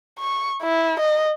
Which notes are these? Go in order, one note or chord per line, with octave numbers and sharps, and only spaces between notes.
C#6
E4
D#5